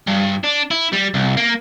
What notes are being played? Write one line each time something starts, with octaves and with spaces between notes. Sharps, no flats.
G2
D4
E4
G3
C2
A#3